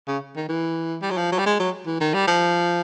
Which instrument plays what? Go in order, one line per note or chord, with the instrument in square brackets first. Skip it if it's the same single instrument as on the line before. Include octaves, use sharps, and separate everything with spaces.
[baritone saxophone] C#3
D#3
E3
G3
F#3
F3
F#3
G3
G#3
F#3
E3
D#3
G3
F3